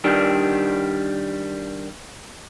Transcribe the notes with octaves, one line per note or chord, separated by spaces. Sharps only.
D#3 G3 D4